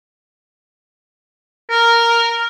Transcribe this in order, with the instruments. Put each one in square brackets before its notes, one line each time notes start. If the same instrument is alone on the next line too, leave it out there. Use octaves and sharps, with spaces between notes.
[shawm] A#4